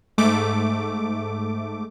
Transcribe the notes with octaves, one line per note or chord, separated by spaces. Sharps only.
G#2 A3 D6